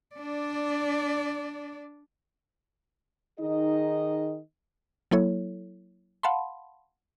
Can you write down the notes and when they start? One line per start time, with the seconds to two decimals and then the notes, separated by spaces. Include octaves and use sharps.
0.16 D4 D5
3.40 D#3 D#4 G#4 D#5
5.11 F#3 A#3 E4 A4 C#5
6.23 F5 F#5 A5 B5 C6